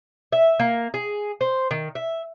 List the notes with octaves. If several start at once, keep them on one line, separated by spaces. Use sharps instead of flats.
E5
A#3
G#4
C5
D#3
E5